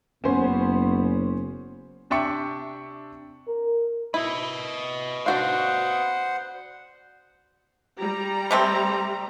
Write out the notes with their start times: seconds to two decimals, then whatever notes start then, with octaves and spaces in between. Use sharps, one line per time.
0.24 F#1 B3 C#4 C5 G#5
2.10 C3 D4 E5 G5 C#6 C#7
3.48 A#4
4.14 E4 B4 D#5
5.26 D4 F#4 C5 F5 F#5
7.99 G3 A#5
8.51 C3 A3 C4